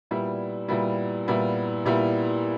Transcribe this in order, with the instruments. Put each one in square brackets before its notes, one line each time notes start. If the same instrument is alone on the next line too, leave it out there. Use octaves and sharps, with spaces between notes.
[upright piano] A#2 G3 B3 E4
A#2 G3 B3 E4
A#2 G3 B3 E4
A#2 G3 B3 E4